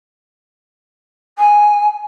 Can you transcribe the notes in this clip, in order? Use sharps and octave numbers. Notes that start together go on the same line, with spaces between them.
G#5